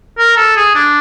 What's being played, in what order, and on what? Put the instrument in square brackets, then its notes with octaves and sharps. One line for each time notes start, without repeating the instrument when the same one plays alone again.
[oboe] A#4
A4
G#4
D4